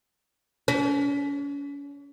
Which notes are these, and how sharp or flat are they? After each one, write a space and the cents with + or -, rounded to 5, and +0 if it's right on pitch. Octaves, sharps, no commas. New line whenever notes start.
C#4 +40